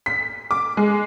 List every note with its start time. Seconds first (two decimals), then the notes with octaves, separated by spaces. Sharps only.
0.06 B6
0.51 D6
0.77 G#3